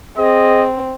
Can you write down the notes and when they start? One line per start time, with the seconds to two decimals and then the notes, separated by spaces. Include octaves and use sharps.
0.18 C4 G#4 D#5